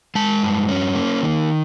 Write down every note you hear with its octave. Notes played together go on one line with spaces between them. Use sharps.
G#3 A5
G2
C#4
A#3
D#3